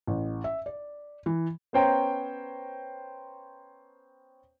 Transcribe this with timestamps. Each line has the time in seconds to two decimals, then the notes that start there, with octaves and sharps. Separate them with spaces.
0.07 A1
0.44 E5
0.66 D5
1.26 E3
1.73 B3 C#4 C5 C#5 G5 A#5